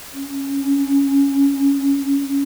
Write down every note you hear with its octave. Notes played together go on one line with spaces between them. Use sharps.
C#4